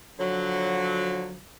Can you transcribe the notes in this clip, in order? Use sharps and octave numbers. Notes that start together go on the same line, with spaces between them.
D3 F3 F#3